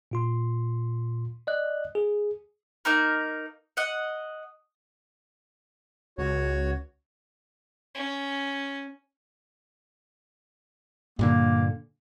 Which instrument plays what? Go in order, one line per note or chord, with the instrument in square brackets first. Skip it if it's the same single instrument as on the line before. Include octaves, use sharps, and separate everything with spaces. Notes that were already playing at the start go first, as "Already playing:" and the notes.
[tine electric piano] A#2 F4 C6
D5 D#5 F#6
G#4
[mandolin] A#3 D#4 A#4
D#5 F#5
[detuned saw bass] C#2 [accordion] F#4 C#5
[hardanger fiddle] C#4
[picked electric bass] G2 A#2 D3 [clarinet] A#3